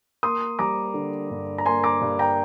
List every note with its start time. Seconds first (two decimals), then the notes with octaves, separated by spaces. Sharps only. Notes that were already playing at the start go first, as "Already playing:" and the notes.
0.23 A#3 C6 D#6
0.59 G3 A#5 D6
0.94 D3
1.30 G2
1.58 A#5
1.66 A#3 G#5 C6
1.83 A#5 D6
2.01 G2
2.19 G5 A#5